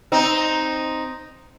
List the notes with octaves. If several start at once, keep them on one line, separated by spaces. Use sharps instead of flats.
C4 D#4